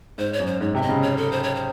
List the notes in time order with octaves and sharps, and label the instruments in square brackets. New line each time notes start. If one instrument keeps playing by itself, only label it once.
[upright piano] G#2 [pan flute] C5
[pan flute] C#5
[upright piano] F#2
[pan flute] C5
[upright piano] G#2 [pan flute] C#5
[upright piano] C3 [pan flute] E5
[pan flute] D#5
[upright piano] C#3
[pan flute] C#5
A4
C5
C#5
C5